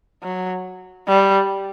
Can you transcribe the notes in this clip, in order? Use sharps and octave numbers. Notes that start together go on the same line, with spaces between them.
F#3
G3